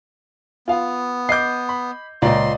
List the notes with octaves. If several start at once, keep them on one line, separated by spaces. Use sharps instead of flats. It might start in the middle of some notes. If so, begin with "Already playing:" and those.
B3 F4 F5
D#5 D6 G6 C7
B5
C#2 A#2 D5 D#5 C6